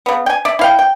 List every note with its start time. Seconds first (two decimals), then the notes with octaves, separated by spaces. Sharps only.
0.06 C#3 B3
0.26 G5 G#5
0.45 D5 E5
0.59 E4 F5 G5
0.79 G5